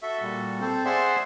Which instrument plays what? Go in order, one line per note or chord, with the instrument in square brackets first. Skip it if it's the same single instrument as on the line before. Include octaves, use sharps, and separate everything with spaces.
[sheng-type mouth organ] F#4 A4 [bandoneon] E5
[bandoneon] A#2 G3
C4 A4 C5
[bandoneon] G#4 D5 F#5 [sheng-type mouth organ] C5 E5 C6